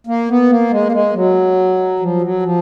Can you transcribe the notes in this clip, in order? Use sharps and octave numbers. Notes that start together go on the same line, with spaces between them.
A#3
B3
A#3
G#3
A#3
G#3
F#3
F3
F#3
F3